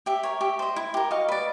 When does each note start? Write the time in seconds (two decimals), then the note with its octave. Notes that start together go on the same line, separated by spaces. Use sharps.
0.06 G4 E5
0.23 A#4 C#5
0.41 G4 E5
0.59 C5 D#5
0.76 E4
0.94 G4 A#4
1.11 F#4 D#5 F5
1.29 B4 D5